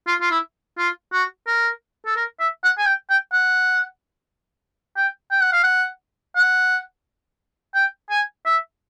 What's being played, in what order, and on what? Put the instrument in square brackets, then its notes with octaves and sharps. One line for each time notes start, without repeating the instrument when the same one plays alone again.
[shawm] F4
F4
E4
F4
F#4
A#4
A4
A#4
E5
F#5
G#5
G5
G5
F#5
G5
G5
F#5
F5
F#5
F#5
G5
G#5
E5